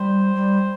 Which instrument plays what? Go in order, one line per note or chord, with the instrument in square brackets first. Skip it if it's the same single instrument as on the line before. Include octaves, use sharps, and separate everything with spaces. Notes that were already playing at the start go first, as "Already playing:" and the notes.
Already playing: [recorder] G3 [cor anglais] C5
[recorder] G3